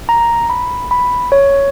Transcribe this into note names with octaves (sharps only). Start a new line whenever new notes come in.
A#5
B5
B5
C#5